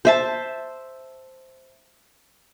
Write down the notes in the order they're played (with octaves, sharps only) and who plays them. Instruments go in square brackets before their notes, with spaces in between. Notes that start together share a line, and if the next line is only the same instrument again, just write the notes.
[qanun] C5 E5 A5